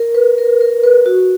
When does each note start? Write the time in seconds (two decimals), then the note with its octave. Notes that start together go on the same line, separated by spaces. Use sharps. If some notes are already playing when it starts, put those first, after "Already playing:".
Already playing: A#4
0.15 B4
0.38 A#4
0.61 A#4
0.84 B4
1.06 F#4
1.19 F#4